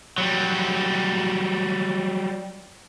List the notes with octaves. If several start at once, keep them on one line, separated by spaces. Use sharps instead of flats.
F#3 G3